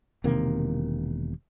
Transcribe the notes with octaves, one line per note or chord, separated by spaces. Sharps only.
E1 C3 D#3 A#3